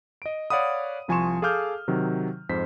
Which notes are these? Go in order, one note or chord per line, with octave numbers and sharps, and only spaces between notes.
D#5 D7
C#5 D5 F5 F#5 B5 D#6
C2 F3 G#5 C6 C#6 E7
G#4 A4 F5 D6 F6 G6
C3 D#3 F#3
F2 G#2 C5 B6